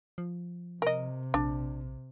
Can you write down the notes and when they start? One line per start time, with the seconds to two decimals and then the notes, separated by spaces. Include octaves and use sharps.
0.18 F3
0.82 C3 A#4 D#5
1.34 A#1 D4